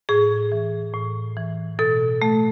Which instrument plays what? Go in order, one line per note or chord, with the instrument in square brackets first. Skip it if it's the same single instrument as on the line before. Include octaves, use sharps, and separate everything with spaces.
[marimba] A2 G#4
E3
A2
E3
B2 A4
A3